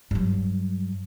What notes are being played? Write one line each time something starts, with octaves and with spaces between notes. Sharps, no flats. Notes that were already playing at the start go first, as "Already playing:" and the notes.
G2 F#3